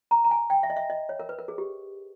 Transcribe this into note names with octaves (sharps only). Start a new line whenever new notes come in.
A#5
A#5
G#5
G5
E5
D#5
E5
D#5
C#5
A#4
B4
A#4
G#4
G4